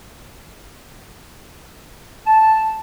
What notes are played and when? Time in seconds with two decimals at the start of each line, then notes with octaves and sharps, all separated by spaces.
2.26 A5